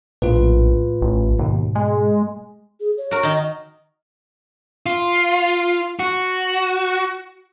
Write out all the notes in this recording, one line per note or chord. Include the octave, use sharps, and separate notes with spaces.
A#1 A2 F4 B4
A1
D#2 G#2 B2
G#3
G#4
C#5
F#4 A#4
D#3 D#4 D#5
F4
F#4